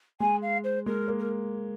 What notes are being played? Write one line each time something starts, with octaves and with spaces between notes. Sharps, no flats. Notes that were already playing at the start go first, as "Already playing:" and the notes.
G#3 G#5
F5
C5
G#3 A#4
A#3
A#4